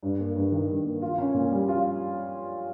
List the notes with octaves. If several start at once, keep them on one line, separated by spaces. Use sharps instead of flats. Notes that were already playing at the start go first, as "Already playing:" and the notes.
G2
A#3
G2
D#3
G2
A#3
F4
C#4
A#2
G3
F4